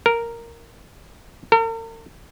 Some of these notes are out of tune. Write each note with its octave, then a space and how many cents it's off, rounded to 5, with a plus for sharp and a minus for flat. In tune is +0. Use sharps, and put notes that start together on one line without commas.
A#4 -5
A#4 -45